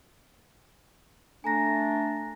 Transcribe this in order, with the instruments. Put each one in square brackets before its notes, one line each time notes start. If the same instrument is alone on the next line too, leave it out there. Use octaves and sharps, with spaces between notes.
[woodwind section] A3 D4 [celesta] G#5 A#5 A#6